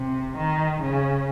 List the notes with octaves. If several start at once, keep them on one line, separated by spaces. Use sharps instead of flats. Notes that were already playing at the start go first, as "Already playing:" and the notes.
Already playing: C3
D#3
C#3